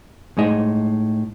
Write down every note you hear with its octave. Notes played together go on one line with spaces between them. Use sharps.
A2 G#3 D#4 D#5